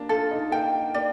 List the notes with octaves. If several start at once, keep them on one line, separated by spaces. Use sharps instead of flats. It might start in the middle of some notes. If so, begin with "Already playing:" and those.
Already playing: A#3 D4
F4 A4
D#4
A#3 G5
A#3 D5